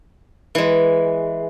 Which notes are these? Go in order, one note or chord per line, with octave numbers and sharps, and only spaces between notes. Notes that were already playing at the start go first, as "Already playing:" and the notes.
E3 G#3